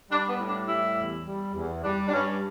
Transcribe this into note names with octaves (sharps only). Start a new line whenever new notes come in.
G3 D4
B3
A2
D4
G3 E4
E2
G3
E2
G3 D4
D4
G2 C#4